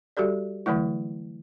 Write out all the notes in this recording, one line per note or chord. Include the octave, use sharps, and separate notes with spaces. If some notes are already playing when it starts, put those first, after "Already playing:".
G3 F#4 G4 A4 D5
D3 E3 F#3 A3 E4